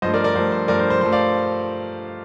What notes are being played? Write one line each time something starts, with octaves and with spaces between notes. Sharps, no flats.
G2 F3 A3 C5 D#5
A#4 D5
A#4 D5
G2 F3 A3 C5
C5
G2 F3 A3 A#4 D5
C5
C5
G2 F3 A3 C5
D5 F5